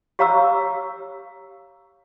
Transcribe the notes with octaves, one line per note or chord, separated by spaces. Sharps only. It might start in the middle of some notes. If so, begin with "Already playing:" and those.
G4 C#5 F5 A#5 D6 E6